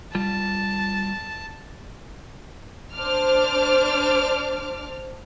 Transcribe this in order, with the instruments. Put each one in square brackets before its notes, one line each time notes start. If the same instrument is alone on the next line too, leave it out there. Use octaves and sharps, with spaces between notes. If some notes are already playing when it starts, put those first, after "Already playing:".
[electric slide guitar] G3 F4 [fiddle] A5
[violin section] D4 C5 D6 F6